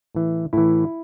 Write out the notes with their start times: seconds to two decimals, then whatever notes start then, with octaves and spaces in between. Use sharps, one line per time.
0.15 A2 E3
0.53 A2 E3 E4